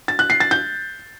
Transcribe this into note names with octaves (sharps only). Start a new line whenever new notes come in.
A6
F#6
C7
A6
G6